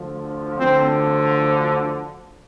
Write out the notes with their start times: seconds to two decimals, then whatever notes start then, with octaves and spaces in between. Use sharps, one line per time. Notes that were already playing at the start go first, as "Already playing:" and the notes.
Already playing: D2 D3 F3
0.59 D2 D3 F3 C4